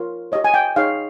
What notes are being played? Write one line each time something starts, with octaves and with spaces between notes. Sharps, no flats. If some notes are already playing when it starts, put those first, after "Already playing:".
Already playing: F4 A#4 C#5
G4 C#5 D#5
G#5
G5
D#4 G#4 C#5 F5